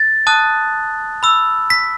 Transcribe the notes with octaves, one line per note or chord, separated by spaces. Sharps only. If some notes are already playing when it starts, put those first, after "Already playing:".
Already playing: A6
A5 D#6 F#6
B5 E6
B6